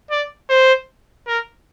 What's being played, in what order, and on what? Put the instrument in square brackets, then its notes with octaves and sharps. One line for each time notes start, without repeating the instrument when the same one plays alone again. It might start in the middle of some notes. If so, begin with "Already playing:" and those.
[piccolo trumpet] D5
C5
A#4